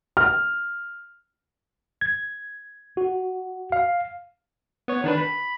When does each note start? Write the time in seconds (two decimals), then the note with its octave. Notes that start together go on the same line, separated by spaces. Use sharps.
0.17 F6
2.01 G#6
2.97 F#4
3.72 F5
4.88 B3 C#5
5.04 D#3 D4 B4
5.18 B5